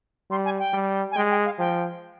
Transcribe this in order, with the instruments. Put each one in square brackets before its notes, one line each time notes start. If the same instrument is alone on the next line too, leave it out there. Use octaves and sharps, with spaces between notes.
[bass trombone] G3 [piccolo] C6
[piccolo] G#5
G5
[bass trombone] G3
[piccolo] G#5
[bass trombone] G#3 [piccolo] G5
[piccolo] G5
F5
[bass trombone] F3 [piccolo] G5